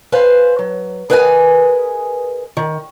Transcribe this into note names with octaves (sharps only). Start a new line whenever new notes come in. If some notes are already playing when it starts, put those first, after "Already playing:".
B4 C5 F5 G#5
F#3
G#4 A#4 B4 D#5 F5 G#5
D#3